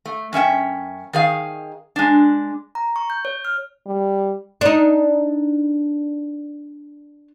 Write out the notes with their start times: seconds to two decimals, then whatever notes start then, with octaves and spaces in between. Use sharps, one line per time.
0.06 A3
0.33 F#2 C#4 E5 G5
1.13 D#3 G#4 F5
1.96 G#3 D4
2.75 A#5
2.96 C#6
3.10 G6
3.25 C#5
3.45 F6
3.86 G3
4.61 D4 D#4